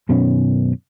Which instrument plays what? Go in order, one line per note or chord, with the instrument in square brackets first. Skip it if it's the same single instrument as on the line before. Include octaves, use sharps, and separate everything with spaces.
[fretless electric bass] F#2 B2 D#3 C#4